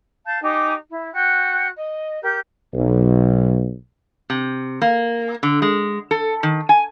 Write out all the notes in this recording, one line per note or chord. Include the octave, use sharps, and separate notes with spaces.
F5 A5 G6
D#4 G4 G#5 D6
E4
F#4 G5 F#6
D#5
G4 A#4 G6
B1
C3
A#3
D3
G#3
A4
D#3
G#5